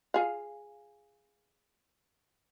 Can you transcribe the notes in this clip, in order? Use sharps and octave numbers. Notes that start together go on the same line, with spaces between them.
F4 G#4 F5